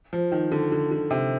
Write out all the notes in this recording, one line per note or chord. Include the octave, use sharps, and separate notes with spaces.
F3
D#3
D3
D3
D3
C3